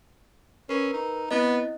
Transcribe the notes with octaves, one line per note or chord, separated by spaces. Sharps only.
C#4 A#4 B4
D#4
B3 C4 E4 D#5